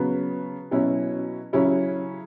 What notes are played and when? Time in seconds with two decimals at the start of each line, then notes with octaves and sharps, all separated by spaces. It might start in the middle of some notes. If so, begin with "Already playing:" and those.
Already playing: C#3 F#3 B3
0.71 B2 F#3 C#4 E4
1.53 C#3 F#3 C#4 E4